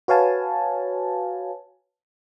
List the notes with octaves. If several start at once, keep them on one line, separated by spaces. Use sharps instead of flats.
F#4 B4 C#5 F5 G#5 A5